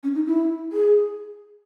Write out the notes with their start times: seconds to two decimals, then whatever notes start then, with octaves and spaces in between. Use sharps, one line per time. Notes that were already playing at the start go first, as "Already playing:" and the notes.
0.03 C#4
0.15 D#4
0.26 E4
0.72 G#4